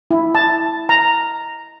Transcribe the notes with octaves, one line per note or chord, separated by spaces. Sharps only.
E4
A5
A#5